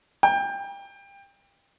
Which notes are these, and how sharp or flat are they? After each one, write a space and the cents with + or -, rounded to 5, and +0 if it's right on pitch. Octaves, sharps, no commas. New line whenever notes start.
G5 +25